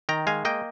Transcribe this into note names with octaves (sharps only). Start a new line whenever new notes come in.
D#3 G5 A#5
G#3 F5 G#5
A#3 D#5 G5